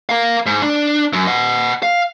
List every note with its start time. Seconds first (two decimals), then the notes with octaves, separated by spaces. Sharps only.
0.09 A#4 F5
0.46 G#2
0.62 D4
1.13 F#2
1.27 D#5 F#5
1.83 F5